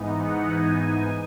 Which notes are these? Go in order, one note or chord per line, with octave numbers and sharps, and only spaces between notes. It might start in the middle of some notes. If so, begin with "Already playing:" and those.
Already playing: G#2 E3 B3 D#4
F#5
G#5